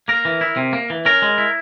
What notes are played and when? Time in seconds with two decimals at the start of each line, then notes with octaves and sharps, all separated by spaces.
0.08 A#3 A#4
0.25 E3
0.41 E4
0.57 C3
0.73 A#3
0.90 E3
1.05 C#4 A#4
1.22 G#3
1.38 E4